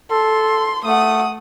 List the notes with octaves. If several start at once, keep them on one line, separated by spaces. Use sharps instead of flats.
A4 C6
A3 F#5 D#6